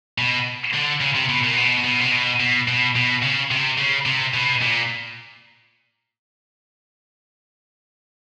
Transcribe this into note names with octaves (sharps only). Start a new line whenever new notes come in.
B2
D3
C#3
C3
B2
A#2
B2
B2
C3
B2
B2
B2
B2
C#3
C3
C#3
C3
B2
A#2